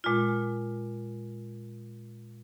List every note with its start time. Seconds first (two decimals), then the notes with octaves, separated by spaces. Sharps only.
0.04 A#2 G#3 F4